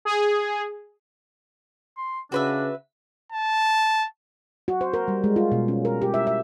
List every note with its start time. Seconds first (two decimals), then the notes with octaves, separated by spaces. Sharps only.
0.05 G#4
1.97 C6
2.32 C#3 D4 F#4 B4 E5
3.32 A5
4.68 F#4
4.81 C5
4.94 A#4
5.08 G3
5.24 G#3
5.36 F4
5.52 B2
5.68 C#4
5.85 A#4
6.02 G4
6.14 E5
6.27 E5